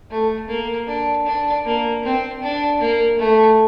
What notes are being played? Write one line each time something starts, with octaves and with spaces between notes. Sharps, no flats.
A3
A#3
D4
D4
A#3
C4
D4
A#3
A3